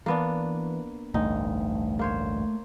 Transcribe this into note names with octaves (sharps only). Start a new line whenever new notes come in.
E3 A#3 B3 D4
A1 D2 G2 A3 D#4
A#3 C5 C#5